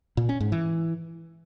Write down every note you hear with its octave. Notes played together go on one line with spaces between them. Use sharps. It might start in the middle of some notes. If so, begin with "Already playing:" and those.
A#2
C#4
G#2
E3